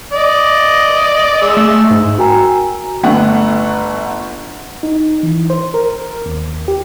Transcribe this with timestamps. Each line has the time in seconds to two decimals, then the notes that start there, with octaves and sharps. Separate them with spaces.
0.13 D5 D#5
1.42 G#3 E6
1.57 A3
1.90 G#2
2.18 F#4 A#4 G5 G#5 A#5 E6
3.03 G1 A3 F#5
4.83 D#4
5.23 E3
5.50 C5
5.74 A#4
6.26 D#2
6.68 G4